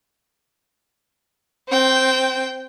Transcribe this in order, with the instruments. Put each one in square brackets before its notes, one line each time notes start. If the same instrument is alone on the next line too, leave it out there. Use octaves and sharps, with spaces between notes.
[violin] C4 G5